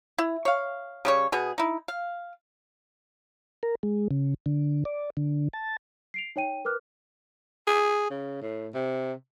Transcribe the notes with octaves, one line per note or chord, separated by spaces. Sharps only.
E4
C#5 F5
C#3 G3 C#5
B2 B3 G#4
D#4 E4
F5
A#4
G#3
C#3
D3
D5
D3
A5
C7 D7 F7
D#4 C#5 G5 D#7
A#4 B4 D6 F6 F#6
G#4
C#3
A2
C3